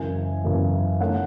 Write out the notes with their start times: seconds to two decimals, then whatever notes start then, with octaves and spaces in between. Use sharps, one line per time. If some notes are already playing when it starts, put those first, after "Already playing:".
Already playing: F#1 F#2 C#3 E3 G#5
0.44 F#1 F#2 C#3 E3
1.00 D#3 A3 C#4 F#5